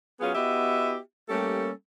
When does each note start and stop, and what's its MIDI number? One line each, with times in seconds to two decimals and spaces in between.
0.21 0.33 54
0.21 0.33 59
0.21 0.33 61
0.21 0.33 65
0.21 0.33 68
0.35 0.97 59
0.35 0.97 64
0.35 0.97 66
0.35 0.97 67
0.35 0.97 75
0.35 0.97 76
1.29 1.70 55
1.29 1.70 57
1.29 1.70 58
1.29 1.70 61
1.29 1.70 67
1.29 1.70 69